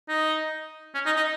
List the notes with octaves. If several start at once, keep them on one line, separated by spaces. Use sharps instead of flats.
D#4
C#4
D#4
D#4